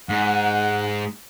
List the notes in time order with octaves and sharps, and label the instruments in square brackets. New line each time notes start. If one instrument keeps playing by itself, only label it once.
[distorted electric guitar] G#2 [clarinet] F#5